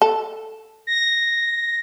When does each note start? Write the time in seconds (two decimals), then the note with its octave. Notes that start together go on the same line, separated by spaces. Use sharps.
0.02 A4
0.87 A#6